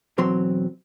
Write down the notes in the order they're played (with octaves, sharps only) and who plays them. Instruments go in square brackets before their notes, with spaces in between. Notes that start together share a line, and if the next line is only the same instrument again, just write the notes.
[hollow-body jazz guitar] B1 E2 F#3 C4 C6